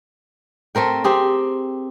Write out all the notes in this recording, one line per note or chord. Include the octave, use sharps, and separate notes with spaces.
A3 C4 A#4 G5
C4 G4 G#4